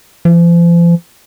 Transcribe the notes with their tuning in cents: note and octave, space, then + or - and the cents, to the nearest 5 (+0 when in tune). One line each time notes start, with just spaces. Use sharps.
F3 -40